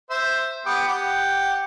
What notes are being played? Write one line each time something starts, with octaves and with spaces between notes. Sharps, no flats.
C5 E5
B3 G4
G4 F#5